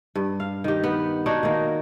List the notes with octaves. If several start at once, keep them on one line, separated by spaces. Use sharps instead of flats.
G2
F5
D#3 G4
B3
D4 D#4 F#4 C#5
D#3 A#3